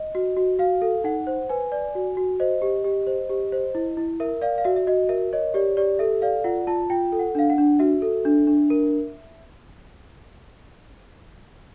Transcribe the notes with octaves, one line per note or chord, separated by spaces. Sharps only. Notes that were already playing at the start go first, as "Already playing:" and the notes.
Already playing: D#5
F#4
F#4
F#4 F5
A4
D#4 F#5
C5
B4 G#5
D5
F#4
F#4
C5 D#5
G4
G4
C5
G4
C5
E4
E4
A#4 E5
D5 F5
F5
F#4 E5
E5
F#4 D#5
A#4 E5
C#5 D#5
G4 D5
G4 D5
A4 E5
D5 F5
F4 F#5
F4 A5
F4 G5
A4
F#5
D4 F5
F#5
D4
F#4 E5
A4
D4
D4
A#4